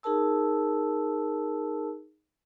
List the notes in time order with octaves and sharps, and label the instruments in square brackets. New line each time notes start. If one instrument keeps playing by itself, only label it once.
[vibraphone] D#4 G#4 A#4 A5 E6